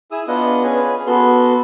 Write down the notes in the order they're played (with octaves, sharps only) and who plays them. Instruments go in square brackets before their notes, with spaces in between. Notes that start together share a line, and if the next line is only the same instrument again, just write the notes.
[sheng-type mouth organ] E4 G#4 D#6 E6
B3 D4 F4 D#5 F#5
C#4 G#4 B4
B3 F#4 A4 C6